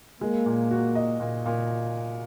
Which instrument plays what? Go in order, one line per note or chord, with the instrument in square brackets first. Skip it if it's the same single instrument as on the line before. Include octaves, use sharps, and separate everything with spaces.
[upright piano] G#3 [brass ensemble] A#3
[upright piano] A#2
F#4
D#5
A#2
A#2